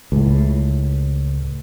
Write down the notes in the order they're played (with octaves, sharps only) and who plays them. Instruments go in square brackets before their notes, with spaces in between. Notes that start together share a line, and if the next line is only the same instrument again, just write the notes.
[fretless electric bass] C#2 A2